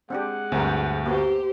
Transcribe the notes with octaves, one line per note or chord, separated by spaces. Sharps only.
G#3 C4 D4 G4 F#5
D2 G2 C4 A#4
A#3 B3 F#4 G4 C5